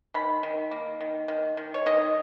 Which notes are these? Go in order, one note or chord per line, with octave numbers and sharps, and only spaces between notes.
D#3 B5
D#3
A#3
D#3
D#3
D#3
C#5
D#3 D#5